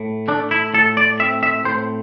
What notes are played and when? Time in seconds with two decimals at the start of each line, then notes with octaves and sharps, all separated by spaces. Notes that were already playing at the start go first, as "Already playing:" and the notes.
Already playing: A2
0.28 A3 D4
0.51 E4
0.74 A2 A4
0.97 D5
1.20 C4 E5
1.43 E5
1.65 A2 C5